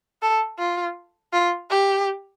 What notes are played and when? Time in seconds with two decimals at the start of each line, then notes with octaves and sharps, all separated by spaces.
0.22 A4
0.59 F4
1.33 F4
1.70 G4